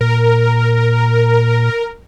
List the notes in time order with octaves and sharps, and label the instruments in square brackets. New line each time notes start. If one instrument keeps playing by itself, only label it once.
[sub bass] A#2 [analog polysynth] A#4